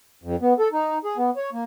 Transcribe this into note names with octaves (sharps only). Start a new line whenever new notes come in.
F2
B3
A4
D#4
G#4
B3
C#5
A#3